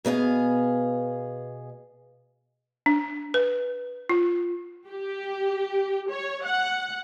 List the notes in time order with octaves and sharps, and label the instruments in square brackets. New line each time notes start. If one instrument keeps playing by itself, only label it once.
[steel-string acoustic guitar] B2 B3 G#4 F5
[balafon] D4
B4
F4
[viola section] G4
C#5
F#5